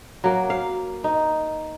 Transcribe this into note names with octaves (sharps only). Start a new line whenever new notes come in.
F#3 A#3
F5
D#4